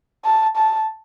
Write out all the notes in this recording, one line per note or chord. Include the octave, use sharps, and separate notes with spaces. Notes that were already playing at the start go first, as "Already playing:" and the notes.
A5
A5